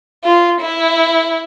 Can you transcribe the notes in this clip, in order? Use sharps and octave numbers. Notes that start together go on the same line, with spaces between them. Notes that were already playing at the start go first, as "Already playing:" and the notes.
F4
E4